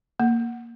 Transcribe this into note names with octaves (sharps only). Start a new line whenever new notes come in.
A#3